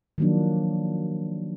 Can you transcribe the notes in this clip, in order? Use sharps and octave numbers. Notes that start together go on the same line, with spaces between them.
D#3 F3 F#3 A#3 D4